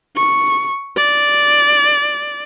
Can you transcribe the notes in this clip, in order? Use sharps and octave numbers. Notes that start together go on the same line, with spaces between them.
C#6
D5